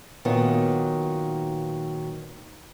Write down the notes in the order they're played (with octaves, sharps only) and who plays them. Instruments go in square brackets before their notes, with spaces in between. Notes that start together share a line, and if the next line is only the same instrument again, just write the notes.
[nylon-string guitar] A#2 D#3 F#3 B3